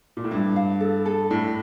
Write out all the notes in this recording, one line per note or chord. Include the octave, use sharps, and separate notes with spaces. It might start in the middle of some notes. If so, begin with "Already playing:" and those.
A#2
A2
G2 E4
F5
A4
A4
A2 D4